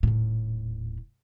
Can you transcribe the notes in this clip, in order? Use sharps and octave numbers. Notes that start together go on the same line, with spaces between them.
D#1 A2